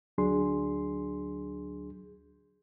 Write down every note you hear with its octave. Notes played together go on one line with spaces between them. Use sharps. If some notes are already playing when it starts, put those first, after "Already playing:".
D2 F#3 D4 G#4 C6